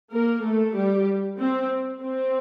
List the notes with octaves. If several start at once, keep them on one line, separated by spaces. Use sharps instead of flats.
A#3 A#4
A3 A4
G3 G4
C4
C4